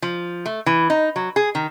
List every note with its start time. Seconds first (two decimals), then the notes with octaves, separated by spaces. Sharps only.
0.02 F3
0.46 A3
0.66 E3
0.90 D#4
1.16 F#3
1.36 G#4
1.55 D#3